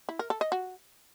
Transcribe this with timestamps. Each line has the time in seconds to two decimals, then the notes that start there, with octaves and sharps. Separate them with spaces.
0.09 E4
0.19 A#4
0.30 A4
0.41 D#5
0.52 F#4